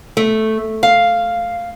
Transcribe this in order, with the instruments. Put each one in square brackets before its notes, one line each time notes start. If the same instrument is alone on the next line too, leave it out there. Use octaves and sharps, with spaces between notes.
[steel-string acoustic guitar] A3
F5